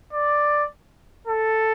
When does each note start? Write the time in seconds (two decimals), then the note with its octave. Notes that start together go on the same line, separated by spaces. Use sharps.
0.13 D5
1.27 A4